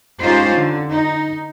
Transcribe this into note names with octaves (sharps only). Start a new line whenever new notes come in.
G#3 C#4 D#4 F4 G4 C5
D3
D#4